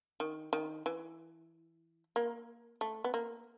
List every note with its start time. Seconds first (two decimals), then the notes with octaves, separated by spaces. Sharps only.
0.20 D#3
0.53 D#3
0.86 E3
2.16 A#3
2.81 A3
3.04 B3
3.14 A#3